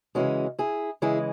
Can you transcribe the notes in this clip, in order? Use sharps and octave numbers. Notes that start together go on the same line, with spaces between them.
C#3 E3 G#3 C#4 F#4
E4 G#4
C#3 E3 G#3 E4 G#4